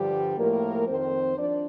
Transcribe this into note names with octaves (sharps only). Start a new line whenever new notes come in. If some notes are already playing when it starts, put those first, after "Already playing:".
Already playing: G2 D3 F3 G3 G4
A2 F3 A#3 A#4
F2 D#3 C4 C5
F3 D4 D5